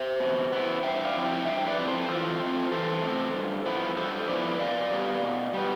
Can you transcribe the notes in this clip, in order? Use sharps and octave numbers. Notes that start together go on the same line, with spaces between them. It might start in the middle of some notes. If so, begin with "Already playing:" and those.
Already playing: C5 E5
B2
B3 E4
G2 E5 G5
D5 F5
F3 C4 E4
E5 G5
G2 E5 G5
B4 D5
F3 C4 E4
A4 C5
E3 F4 A4
A3 C4
E3 A4 C5
A3 C4
G2
F3 B3 E4
G2 A4 C5
F3 B3 E4 B4 D5
B2 D5 F5
G3 B3
B2
G3 B3